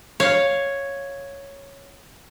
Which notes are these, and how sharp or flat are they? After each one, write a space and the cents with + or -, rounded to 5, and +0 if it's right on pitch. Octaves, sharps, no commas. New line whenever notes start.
C#5 +0 F5 +0